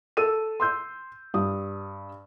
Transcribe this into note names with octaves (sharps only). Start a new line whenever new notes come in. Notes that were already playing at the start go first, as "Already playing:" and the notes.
A4 E6 D#7
C6 E6 G6
G2 D#6